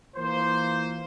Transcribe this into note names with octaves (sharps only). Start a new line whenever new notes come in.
E3 A#3 F4 C5